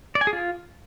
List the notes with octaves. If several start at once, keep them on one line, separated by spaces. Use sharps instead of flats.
D5
G#5
G#4
F4